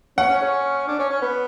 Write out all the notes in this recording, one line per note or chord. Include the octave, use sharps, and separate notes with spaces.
C#4 F#5
C#4
C#4
D4
C#4
C#4
B3